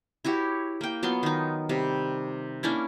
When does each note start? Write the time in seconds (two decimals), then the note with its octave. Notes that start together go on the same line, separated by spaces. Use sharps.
0.25 E4 F#4 G4 C#5
0.81 A#3 G5
1.03 F#3 B3 F4 C6
1.23 D#3 D#4
1.69 C3 G3
2.63 A#3 C#4 D4 E4